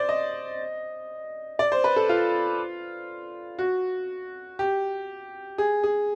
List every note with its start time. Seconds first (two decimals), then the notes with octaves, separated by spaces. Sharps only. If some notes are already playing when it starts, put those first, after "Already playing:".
Already playing: C5 D5
0.09 D#5
1.59 D5
1.72 C5
1.84 B4
1.96 A4
2.09 F4
3.59 F#4
4.59 G4
5.58 G#4
5.84 G#4